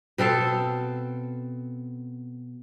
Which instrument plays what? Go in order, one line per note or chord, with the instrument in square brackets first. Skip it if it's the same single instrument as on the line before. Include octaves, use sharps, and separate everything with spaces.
[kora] B2 C4 A4 F5